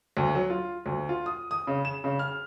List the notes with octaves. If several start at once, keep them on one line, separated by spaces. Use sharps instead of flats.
D2
F#3
F4
D2
F4
D#6
D#6
C#3
E7
C#3
F6